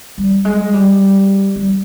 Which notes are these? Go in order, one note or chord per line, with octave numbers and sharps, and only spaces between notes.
G3
G#3
G3
G3